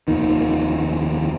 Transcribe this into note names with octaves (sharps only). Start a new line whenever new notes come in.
F1 D#2 D#3